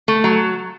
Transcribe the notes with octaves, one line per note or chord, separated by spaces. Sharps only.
A3
F#3